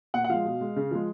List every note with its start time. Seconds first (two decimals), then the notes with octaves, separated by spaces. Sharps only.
0.14 A#2 F#5
0.24 F#5
0.29 F3 G#3 F5
0.45 B2
0.61 G#3
0.76 C#3
0.91 F3 G#3